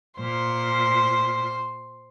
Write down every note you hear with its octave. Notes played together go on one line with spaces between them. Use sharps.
A#2 C5